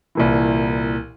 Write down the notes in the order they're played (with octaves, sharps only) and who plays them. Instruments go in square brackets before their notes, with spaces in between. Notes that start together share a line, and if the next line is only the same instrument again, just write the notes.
[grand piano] C2 A#2 E3